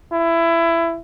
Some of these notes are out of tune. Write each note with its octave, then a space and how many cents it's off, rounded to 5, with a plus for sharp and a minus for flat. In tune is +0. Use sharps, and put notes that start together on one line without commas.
E4 +20